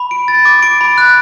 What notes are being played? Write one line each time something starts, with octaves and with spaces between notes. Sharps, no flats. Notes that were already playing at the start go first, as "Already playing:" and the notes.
Already playing: B5
D7
A6
D6
D7
B5
F#6